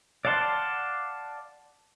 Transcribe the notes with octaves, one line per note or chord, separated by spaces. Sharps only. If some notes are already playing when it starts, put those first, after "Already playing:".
D5 F5 F#5 A5 C6